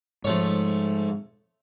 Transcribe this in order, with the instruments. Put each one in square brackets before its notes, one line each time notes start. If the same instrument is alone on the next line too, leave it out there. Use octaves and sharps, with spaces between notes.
[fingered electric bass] G#2 [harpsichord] F3 A3 C#5